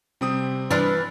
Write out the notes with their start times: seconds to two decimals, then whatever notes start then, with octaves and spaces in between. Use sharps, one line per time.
0.21 C3 G3 C4 D#6
0.71 E3 D4 B4 B5 F6 A6